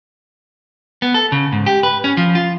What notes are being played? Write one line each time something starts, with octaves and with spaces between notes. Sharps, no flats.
B3
A4
C#3
G#2
G4
B4
C#4
F3
F4